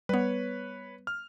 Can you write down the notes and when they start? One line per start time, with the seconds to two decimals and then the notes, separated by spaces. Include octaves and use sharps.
0.09 G3 B3 B4 C#5
1.07 F6